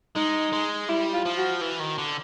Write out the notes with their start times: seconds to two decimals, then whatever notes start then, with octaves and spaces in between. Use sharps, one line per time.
0.16 G#3 D#4
0.53 G#3
0.89 G3 E4
1.13 F4
1.26 F3
1.37 F#4
1.61 E3
1.80 D#3
1.98 D3